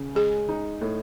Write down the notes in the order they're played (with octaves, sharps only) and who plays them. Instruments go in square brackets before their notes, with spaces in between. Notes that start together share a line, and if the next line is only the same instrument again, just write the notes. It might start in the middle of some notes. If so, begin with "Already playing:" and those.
Already playing: [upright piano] C#3
[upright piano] G#3 [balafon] G#4
[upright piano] D#4
A2